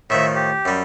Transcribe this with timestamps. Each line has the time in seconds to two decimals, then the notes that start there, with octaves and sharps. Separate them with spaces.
0.10 A2 D#3 F3 E5
0.35 G4
0.65 F#2 G3